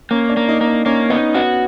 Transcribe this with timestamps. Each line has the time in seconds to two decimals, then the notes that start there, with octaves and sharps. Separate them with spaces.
0.11 A#3 C#4
0.29 D4
0.37 A#3
0.49 D#4
0.61 A#3
0.67 D4
0.86 A#3 C#4
1.10 B3 D#4
1.35 B3 F#4